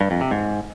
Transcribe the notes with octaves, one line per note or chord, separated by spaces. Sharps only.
G2
F2
C3
G#2